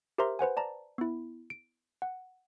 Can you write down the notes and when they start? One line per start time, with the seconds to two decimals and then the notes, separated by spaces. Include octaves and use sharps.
0.18 G4 A#4 C5 E5 A#5 C6
0.39 B4 C5 F#5 G#5
0.57 D5 A5 A#5
0.98 B3 E4
1.50 D7
2.02 F#5